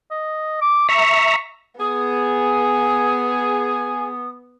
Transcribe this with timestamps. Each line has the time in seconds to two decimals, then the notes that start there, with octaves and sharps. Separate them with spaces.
0.11 D#5
0.61 D6
0.89 E5 A#5 C#6
1.80 B3 G#4 D#6